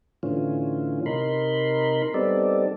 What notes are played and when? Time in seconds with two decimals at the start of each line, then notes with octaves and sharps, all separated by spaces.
0.23 A2 D3 E3 C#4 F4
1.06 C3 D#4 A#4 B5 C6
2.14 G3 B3 C4 D#4 A4 D5